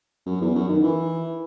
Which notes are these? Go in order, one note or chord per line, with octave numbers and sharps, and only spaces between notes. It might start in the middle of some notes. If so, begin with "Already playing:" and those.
F#2
E2
F#2
D#3
E3